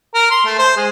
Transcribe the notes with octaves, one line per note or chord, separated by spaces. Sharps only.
A#4
C6
A3
C5
G#3